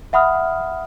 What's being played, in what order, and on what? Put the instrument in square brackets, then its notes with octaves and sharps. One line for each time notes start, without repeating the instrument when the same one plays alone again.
[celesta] E5 F#5 B5 D#6 F6